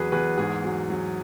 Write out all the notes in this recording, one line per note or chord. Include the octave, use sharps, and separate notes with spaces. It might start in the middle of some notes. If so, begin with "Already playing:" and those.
Already playing: E2 F#3 G#4 B4
E2 G#4 B4
G#2 G#4
F#3
F#3